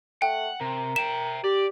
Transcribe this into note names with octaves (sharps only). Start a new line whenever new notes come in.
A3 F#5 G5
C3 A#4
E5 G5 E7
G4 D5